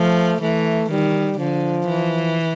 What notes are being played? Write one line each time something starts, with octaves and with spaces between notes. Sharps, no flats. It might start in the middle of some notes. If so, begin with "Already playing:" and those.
Already playing: F3 A3
E3 A3
D#3 G3
D3 F3
E3